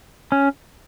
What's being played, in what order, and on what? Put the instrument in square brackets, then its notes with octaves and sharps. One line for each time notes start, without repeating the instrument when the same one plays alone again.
[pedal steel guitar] C#4